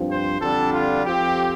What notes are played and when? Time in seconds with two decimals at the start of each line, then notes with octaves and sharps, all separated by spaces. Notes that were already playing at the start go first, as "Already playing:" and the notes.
Already playing: G2 F3 C4
0.10 C5
0.41 F2 D3 G3 D4 A4
0.73 F4
1.04 F2 F3 C4 G4